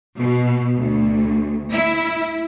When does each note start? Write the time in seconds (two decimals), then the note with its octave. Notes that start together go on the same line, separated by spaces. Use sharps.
0.18 B2
0.77 D2
1.71 E4